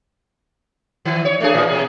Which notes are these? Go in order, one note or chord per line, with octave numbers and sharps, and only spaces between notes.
D#3
C#5
A3 D4 G#4
A2 E3 A#3
B2 G#4